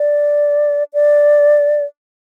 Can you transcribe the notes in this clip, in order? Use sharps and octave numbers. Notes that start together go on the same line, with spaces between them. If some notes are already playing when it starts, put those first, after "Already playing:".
Already playing: D5
D5